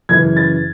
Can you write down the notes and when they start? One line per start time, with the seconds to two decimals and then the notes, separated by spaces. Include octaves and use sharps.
0.09 F#2 C#3 E3 G#6
0.37 A6